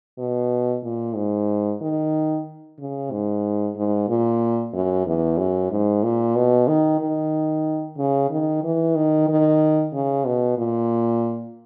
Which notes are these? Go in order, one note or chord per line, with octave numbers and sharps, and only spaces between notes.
B2
A#2
G#2
D#3
C#3
G#2
G#2
A#2
F#2
E2
F#2
G#2
A#2
B2
D#3
D#3
C#3
D#3
E3
D#3
D#3
C#3
B2
A#2